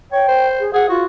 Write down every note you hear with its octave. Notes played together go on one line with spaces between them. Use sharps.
C#5 G5
C5
G#4
G#4 F#5
F4 F#4